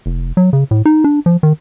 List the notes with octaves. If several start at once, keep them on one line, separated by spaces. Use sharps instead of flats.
F1
F#3
C#3
A2
D#4
D4
F3
D#3